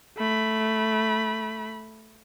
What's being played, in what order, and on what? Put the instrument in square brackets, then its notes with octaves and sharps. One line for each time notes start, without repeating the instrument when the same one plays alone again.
[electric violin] A3 B5